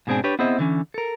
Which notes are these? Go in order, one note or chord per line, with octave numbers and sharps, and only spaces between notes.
G#2 B2 G#3 C4 D4 G#4
D4 G4 B4 C#5
B3 C4 E4 G#4 C5 D#5
D3 E3 C#4
A4 A#4